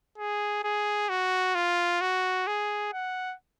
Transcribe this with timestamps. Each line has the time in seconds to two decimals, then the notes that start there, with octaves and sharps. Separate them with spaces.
0.18 G#4
0.63 G#4
1.09 F#4
1.55 F4
2.01 F#4
2.47 G#4
2.93 F#5